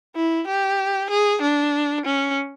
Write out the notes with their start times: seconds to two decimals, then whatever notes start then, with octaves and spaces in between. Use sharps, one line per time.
0.16 E4
0.48 G4
1.10 G#4
1.42 D4
2.06 C#4